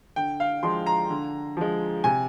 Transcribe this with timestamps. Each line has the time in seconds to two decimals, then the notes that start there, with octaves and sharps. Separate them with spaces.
0.16 D3 G5
0.40 F5
0.63 F3 G#3 C6
0.86 A#5
1.10 D3
1.57 F3 G#3
2.04 C3 G#5